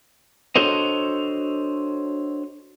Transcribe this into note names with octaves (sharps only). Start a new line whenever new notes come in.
D4 F#4 A4 C5 C#5 D#5